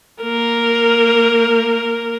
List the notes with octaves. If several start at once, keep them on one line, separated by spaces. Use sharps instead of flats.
A#3 A#4